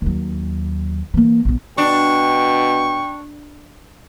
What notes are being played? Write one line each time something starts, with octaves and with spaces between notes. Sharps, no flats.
D#2 F#3
E3 A#3
A#1 B3
B2 D4 G5 C#6